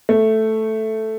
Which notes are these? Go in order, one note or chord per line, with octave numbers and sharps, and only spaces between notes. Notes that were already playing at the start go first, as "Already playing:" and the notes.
A3